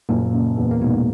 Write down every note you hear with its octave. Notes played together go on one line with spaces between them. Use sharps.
F#1 A#2 A#3
C#3
E2
A#3
G#2 B2 B3